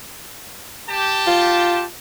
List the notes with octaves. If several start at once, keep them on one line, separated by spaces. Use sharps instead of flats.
G4 A5
F4